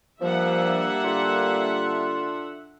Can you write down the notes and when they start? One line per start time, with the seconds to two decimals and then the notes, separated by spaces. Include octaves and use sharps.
0.21 F3 G3 A#3 D4 E5 F#5
1.04 D3 F4